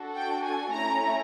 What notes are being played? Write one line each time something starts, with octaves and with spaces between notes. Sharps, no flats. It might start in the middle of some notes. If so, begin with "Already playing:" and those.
Already playing: D4 F#4 A4
G5
G#5
A3 C#4 E4 A#5